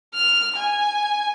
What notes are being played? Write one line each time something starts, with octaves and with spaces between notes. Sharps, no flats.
F6
G#5